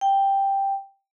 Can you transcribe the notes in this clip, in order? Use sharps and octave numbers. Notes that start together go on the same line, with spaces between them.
G5